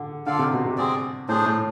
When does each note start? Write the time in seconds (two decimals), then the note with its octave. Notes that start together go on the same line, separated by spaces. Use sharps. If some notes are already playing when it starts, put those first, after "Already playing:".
Already playing: D3
0.26 D3 F4 A4 D5 F5
0.39 C3
0.53 B2
0.66 C3
0.77 G#3 C4 G#4 D5
1.28 A2 D4 G#4 C5
1.46 A2